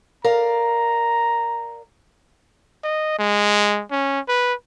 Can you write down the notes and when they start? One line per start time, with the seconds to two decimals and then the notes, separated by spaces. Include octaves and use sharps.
0.24 A#4 D5 F5 A#5
2.84 D#5
3.19 G#3
3.91 C#4
4.28 B4